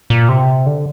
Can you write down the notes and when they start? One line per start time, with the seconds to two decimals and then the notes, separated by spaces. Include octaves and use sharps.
0.10 A#2
0.29 C3
0.66 D3